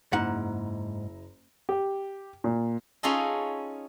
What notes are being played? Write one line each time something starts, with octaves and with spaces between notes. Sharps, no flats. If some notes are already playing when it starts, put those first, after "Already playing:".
F#1 G#2 E4 F#5 A#5
G4
A#2
C#4 D#4 F4 G#4 A4 D#5